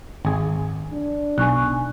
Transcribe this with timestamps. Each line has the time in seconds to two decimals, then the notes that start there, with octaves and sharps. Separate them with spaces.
0.25 G#1 G#4
0.91 D4
1.38 B1 G#5 C#6 F#6